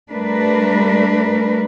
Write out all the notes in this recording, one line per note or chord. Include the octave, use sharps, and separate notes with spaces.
G3 A3 D4 A#4 B4